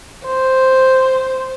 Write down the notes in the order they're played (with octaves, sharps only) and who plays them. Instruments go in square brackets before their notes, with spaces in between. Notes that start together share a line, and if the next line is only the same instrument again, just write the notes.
[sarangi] C5